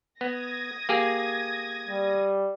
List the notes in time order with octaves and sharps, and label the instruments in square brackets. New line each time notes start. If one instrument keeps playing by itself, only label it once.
[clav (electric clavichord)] B3 [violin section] D#6 G#6 A#6
[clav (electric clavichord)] A#3 G4 G#4
[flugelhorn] G3